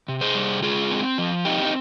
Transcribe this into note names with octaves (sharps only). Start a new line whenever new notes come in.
C3
G#4 C5
G3
G#3 F4 G#4
C4
F3
C4 D#4 G4
D#4